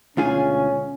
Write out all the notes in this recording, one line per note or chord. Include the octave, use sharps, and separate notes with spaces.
D2 B2 G#3 C#4 F4 G#4